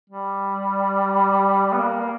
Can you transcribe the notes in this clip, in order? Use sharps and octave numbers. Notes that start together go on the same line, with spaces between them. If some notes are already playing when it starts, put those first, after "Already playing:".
G3
B3
A#3